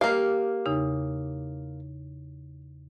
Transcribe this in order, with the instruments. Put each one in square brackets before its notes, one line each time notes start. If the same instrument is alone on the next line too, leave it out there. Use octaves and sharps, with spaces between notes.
[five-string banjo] A#3 F5 [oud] G4
[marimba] E2 C#3 D#4